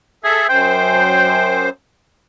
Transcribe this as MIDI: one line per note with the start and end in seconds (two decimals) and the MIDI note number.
0.24 0.46 68
0.24 0.47 69
0.24 0.47 76
0.49 1.69 42
0.49 1.69 72
0.49 1.66 79